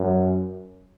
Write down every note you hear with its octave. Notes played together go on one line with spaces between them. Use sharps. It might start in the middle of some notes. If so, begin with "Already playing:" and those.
Already playing: F#2